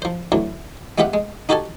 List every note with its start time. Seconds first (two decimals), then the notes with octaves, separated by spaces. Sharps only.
0.02 F3 C5
0.32 D2 E3 F#3
0.98 G#3 B3 F4 G4 E5 F#5
1.14 G#3
1.49 D#4 F#4 G4 A4 G#5 A5